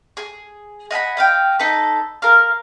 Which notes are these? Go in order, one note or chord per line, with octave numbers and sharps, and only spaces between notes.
G#4
D#5 F#5 G#5 B5
D#5 F5 G5
D#4 A4 B4
A#4 F5